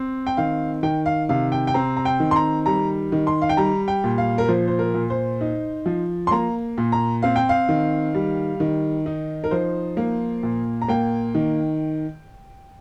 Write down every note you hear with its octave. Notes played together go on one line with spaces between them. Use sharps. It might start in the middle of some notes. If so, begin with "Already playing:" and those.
Already playing: C4
G5
D#3 F5
D#3 G5
F5
C3 F5
G5
G5
C4 A#5
A#5
G5
D#3
C6
A#5
G3 A#5
D#3
C6
F5
G5
G3 A#5
G5
A#2
F5
A#4
F3 C5
C5
A#4
A#2
C5
D#4
F3
C6
A#3 A#5
A#2
A#5
C4 F5
G5
F5
D#3
G3
D#3
D#4
A#4
F3 C5
A#3
A#2
A#5
A#3 G5
D#3